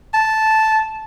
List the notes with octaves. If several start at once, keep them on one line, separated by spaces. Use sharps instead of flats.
A5